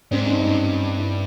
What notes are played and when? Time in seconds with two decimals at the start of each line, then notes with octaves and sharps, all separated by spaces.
0.11 G#2 C4 D4
0.26 C#4 D#4
0.33 G2
0.40 C#4 D#4
0.97 D4 E4